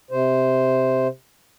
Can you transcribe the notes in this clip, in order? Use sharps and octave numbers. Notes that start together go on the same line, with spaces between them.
C3 C5